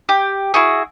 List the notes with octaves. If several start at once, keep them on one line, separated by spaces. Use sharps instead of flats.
G4
E4 F#4 G#4